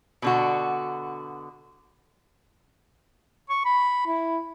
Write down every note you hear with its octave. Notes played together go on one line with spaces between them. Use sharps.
B2 D3 F#4
C#6
B5
E4